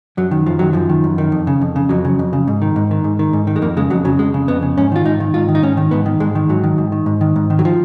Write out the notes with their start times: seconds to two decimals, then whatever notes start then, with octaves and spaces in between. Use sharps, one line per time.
0.17 F#2 F#3
0.31 D#3
0.46 F#2 F3
0.59 D#3 F#3
0.73 F#2 F3
0.89 D#3
1.04 F#2
1.18 D#3
1.32 F2
1.47 C#3
1.61 F2
1.76 C#3
1.89 F2 F#3
2.05 C#3
2.19 F2
2.33 C#3
2.48 G#2
2.62 D#3
2.76 G#2
2.91 D#3
3.04 G#2
3.19 D#3
3.33 G#2
3.47 D#3
3.56 G#3
3.62 F2 A#3
3.77 C#3 G#3
3.90 F2 F#3
4.05 C#3 F#3
4.19 F2 G#3
4.34 C#3
4.48 F2 B3
4.62 C#3
4.77 G#2 C#4
4.92 D#3 F4
5.05 G#2 D#4
5.20 D#3
5.34 G#2 F4
5.49 D#3
5.55 D#4
5.63 G#2 C#4
5.77 D#3
5.91 G#2 B3
6.06 D#3
6.20 G#2 G#3
6.35 D#3
6.49 G#2 F#3
6.64 D#3
6.78 G#2
6.92 D#3
7.06 G#2
7.21 D#3
7.36 G#2
7.50 D#3
7.59 F#3
7.65 F3